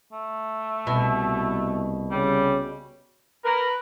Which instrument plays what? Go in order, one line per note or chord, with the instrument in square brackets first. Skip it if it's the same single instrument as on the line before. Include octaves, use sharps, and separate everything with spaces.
[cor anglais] A3
[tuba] C2 [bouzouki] B2
[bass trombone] C#3 [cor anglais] G3
[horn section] A#4 [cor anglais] B4